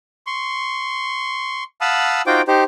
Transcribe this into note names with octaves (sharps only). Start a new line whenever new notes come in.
C6 C#6
F5 F#5 A5 B5 D#6 E6
D#4 F4 F#4 C5 G5 D6
D#4 G4 C5